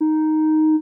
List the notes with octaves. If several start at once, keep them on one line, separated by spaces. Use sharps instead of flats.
D#4